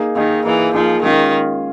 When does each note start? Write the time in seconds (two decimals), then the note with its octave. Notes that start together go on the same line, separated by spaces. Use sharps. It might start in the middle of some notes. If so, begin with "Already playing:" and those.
Already playing: A#3 D#4 G#4
0.16 D#3 A#3 D#4 G#4
0.45 E3 A#3 D#4 G#4
0.75 F3 A#3 D#4 G#4
1.03 D#3 G#3 C#4 F4 G#4